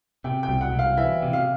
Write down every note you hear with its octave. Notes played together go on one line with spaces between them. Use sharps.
C3 G5
G5
C2
F#5
C2
F5
E3 E5
C3
F5